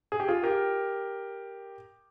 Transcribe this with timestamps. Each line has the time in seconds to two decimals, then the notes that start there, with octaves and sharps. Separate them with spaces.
0.12 G#4
0.20 G4
0.28 F4 G#4
0.43 G4 A#4